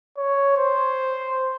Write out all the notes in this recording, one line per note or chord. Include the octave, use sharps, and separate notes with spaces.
C#5
C5